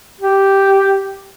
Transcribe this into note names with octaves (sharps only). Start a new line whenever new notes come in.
G4